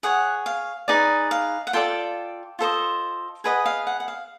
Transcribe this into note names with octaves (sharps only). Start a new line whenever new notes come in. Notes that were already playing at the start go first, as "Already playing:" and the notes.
G#4 C#5 F#5
F5
D#4 G#4 B4 D5
F5
F#5
F4 A4 D5 G5
F4 A4 C5 D#5
G#4 B4 D#5 F#5
F5
F#5
F#5
F5